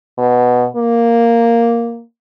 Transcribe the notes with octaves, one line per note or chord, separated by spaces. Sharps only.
B2
A#3